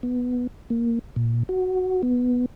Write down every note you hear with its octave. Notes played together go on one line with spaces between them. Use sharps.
B3
A#3
A#2
F#4
B3